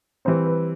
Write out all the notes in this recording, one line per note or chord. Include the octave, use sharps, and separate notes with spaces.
E3 G3 C4 C5
B4